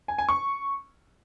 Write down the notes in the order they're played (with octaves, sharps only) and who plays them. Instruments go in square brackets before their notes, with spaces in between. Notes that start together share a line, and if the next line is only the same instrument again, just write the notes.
[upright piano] G#5
G#5
C#6